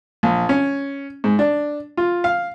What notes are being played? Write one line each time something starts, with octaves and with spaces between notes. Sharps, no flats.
A#1
C#4
G#2
D4
F4
F5